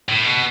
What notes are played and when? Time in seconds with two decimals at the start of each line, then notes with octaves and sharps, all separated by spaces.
0.08 A2
0.24 B2